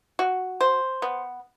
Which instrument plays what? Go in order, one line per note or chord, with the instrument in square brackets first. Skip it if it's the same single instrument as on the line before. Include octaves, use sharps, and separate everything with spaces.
[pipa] F#4
C5
B3